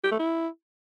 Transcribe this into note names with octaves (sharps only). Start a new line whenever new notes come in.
G4
A3
E4